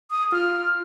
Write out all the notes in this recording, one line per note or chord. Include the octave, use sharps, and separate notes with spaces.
D#6
F4 F6